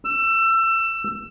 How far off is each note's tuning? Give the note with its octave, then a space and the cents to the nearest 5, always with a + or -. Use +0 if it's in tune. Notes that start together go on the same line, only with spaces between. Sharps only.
E6 +25